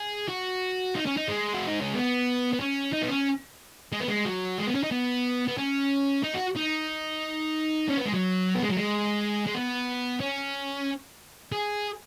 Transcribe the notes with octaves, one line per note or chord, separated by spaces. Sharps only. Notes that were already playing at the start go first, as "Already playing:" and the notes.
Already playing: G#4
F#4
D#4
C#4
D#4
G#3
F#4
D#4
C#4
B3
B3
C#4
D#4
B3
C#4
G#3
B3
G#3
F#3
G#3
B3
C#4
D#4
B3
B3
C#4
D#4
F#4
D#4
C#4
B3
G#3
F#3
B3
G#3
F#3
G#3
G#3
B3
C#4
G#4